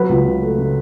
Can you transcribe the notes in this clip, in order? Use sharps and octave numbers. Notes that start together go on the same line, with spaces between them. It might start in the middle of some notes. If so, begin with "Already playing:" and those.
Already playing: F#3 B4
C#2
C#3
A3
C#3